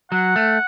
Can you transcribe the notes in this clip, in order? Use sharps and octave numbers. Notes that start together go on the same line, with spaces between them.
F#3 F#5
A3